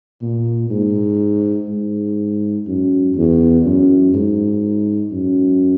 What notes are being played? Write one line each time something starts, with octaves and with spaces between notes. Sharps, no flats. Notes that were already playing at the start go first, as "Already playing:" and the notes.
A#2
G#2
G#2
F#2
E2
F#2
G#2
F#2